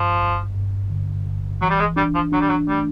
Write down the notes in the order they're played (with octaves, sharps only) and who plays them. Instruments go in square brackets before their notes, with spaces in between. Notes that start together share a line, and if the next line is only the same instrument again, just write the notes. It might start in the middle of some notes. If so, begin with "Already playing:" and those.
Already playing: [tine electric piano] G2 [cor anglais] F3
[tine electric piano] G1
G2
D3
G1
[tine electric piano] E3 [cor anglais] F#3
[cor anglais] G3
G#3
[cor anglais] G3 [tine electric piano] D4
[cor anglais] F3
[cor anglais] F#3 [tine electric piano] D4
[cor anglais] G3
F#3
[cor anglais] G3 [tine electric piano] A3